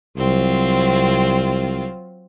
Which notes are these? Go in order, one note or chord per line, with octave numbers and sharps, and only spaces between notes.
C2 F#3 C4 F4